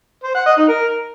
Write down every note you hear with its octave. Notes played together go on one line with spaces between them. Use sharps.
C5
F#5
D#5
D#4
A#4